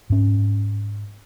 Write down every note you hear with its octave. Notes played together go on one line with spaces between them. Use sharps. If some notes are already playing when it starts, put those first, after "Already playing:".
G#2 C#4